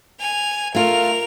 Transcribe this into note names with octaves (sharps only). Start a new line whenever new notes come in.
G#5 F7
A3 F4 A#4 F7